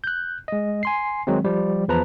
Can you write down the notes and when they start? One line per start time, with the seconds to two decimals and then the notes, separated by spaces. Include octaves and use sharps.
0.04 F#6 G6
0.48 G#3 D#5
0.83 G#5 C6 C7
1.27 D#3 F#3 G#3 C4
1.44 F3 G3
1.88 E2 F3 B4 A5 A#5